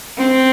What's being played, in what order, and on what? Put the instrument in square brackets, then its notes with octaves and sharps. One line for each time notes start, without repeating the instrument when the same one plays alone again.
[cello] C4